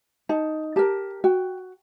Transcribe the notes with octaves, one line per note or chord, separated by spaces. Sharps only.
D#4 A5
G4 A#4 A5
F#4 G5